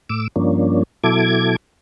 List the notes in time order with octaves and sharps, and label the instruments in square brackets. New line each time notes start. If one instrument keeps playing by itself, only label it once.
[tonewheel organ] A2 D6 E6
G2 F3 A#3 C#4 D4
B2 F#3 E4 A4 D6 G#6